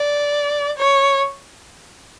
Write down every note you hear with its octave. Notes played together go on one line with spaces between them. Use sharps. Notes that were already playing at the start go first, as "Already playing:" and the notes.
Already playing: D5
C#5